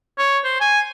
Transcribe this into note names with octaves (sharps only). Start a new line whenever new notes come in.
C#5
C5
G#5